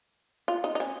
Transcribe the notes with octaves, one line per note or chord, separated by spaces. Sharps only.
F4
D#4
D#4
C#4